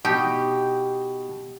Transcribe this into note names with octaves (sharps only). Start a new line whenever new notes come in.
B2 D#4 G4